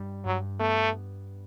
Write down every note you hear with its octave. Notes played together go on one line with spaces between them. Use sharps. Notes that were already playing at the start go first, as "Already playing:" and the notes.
Already playing: G2 G3
G2 F#3
A3 B3